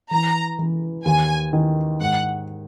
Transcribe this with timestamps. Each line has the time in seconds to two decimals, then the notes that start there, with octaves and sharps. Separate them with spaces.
0.11 E3 A#5
0.59 E3
1.05 D#2 G#5
1.53 D#3
2.01 G#2 F#5